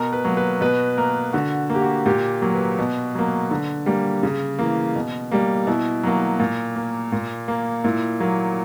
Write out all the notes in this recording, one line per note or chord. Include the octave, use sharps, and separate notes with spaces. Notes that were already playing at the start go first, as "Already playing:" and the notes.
Already playing: B2 A#4
B4
F#3 A#3
B4
B2 B4
A#3 A#4
D3 F#4
A#3
G4
F#4
A#2 G4
F#3 A#3
B4
B2
F#3 A#3
D3
G3 A#3
C#3
E3 A#3
B2
G3 A#3
B2 E4
F#3 A#3
A#2
A#3
A#2
A#3
A#2 E4
F#3 A#3